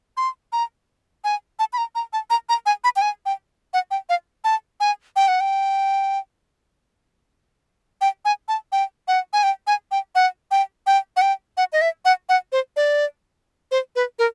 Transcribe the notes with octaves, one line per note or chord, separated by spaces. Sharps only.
C6
A#5
G#5
A5
B5
A#5
A#5
A5
A#5
A#5
G#5
B5
G5
G#5
G5
F#5
G5
F5
A5
G#5
G5
F#5
G5
G5
G#5
A5
G5
F#5
G#5
G5
G#5
G5
F#5
G5
G5
F#5
G5
F#5
D#5
E5
F#5
F#5
C5
D5
C5
B4
A#4